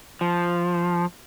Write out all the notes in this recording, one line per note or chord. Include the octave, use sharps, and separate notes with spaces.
F3